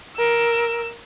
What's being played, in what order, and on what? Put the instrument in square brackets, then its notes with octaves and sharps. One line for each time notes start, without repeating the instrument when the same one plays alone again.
[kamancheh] A#4 E6